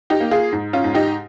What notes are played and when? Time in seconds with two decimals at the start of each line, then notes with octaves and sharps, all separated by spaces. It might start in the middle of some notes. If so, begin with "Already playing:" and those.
0.10 D#4 G4
0.20 A#3
0.31 F4 G#4
0.52 G#2
0.73 C#4 F4
0.84 G#2
0.94 D#4 G4